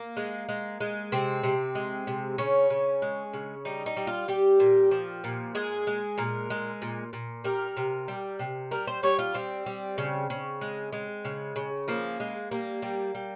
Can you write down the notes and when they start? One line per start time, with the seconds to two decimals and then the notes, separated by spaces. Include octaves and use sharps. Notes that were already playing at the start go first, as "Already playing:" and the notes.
Already playing: A#3
0.17 G#3
0.49 G#3
0.80 G#3
1.12 C3 C4
1.43 C3
1.75 G#3
2.07 C3
2.38 C#3 C#4
2.70 C#3
3.02 G#3
3.33 C#3
3.65 G3 D#4
3.86 D#4
3.97 G3
4.07 F4
4.28 G3 G4
4.60 A#2
4.91 F3
5.24 A#2
5.55 G#3 G#4
5.87 G#3
6.18 A#2 A#4
6.50 G#3
6.82 A#2
7.13 A#2
7.44 G3 A#4
7.77 C3
8.08 G3
8.39 C3
8.71 G3 A#4
8.87 C5
9.03 G3 C#5
9.19 F4
9.34 G3 C4
9.66 G3
9.98 C#3
10.30 C#3
10.61 G#3
10.93 G#3
11.25 C#3
11.56 C#3
11.88 F3 A#3
12.20 G#3
12.51 G3 A#3
12.82 G3
13.15 G3